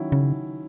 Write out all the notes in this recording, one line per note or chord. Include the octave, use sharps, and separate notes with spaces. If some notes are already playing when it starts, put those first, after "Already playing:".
Already playing: D#3 F#3 C#4 E4
C#3